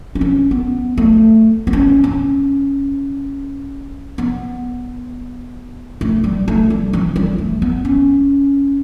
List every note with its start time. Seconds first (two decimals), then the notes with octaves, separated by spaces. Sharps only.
0.15 D4
0.21 C#4
0.51 B3
0.98 A3
1.67 B3
1.73 C#4
2.04 C#4
4.18 B3
6.01 A3
6.24 G3
6.48 A3
6.70 G3
6.93 E3
7.16 G3
7.38 A3
7.62 B3
7.85 C#4